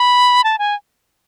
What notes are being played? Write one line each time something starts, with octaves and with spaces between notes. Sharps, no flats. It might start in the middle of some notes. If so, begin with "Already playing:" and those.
Already playing: B5
A5
G#5